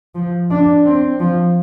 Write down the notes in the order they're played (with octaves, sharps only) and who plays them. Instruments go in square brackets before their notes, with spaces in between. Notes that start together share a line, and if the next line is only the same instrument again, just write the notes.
[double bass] F3
D4
C4
F3